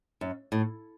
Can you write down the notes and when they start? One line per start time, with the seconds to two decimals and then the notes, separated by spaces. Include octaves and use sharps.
0.21 F#2
0.52 A2